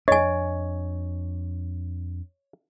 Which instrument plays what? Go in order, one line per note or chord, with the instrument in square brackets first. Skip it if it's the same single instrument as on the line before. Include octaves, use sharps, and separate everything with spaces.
[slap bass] F2 D4 [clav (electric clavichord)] C#5 [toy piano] D#5 G#5